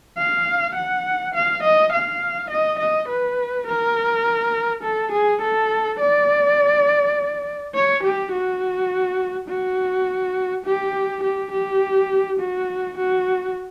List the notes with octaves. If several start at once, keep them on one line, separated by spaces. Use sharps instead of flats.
F5
F#5
F5
D#5
F5
D#5
D#5
B4
A#4
A4
G#4
A4
D5
C#5
G4
F#4
F#4
G4
G4
G4
F#4
F#4